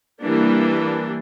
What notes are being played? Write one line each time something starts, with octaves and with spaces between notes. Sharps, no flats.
E3 G3 A#3 D4